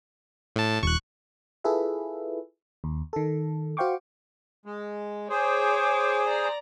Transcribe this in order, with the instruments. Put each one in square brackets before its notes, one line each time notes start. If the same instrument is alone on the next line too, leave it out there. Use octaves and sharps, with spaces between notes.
[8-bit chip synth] A2 A5
[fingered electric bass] D#1 [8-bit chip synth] C#6 F#6
[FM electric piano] E4 F4 G#4 A4 B4 E5
D#2
D#3 A4
F#4 C5 F5 G5 C#6 D6
[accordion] G#3
[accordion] G#4 C5 [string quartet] C#5 D6
[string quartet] D5 A#5